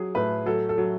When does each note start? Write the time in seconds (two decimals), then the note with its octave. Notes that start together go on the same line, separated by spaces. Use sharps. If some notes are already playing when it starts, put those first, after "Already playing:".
Already playing: F#3 G#4
0.15 A2 B4
0.46 F#3 A4
0.69 A4
0.78 F#3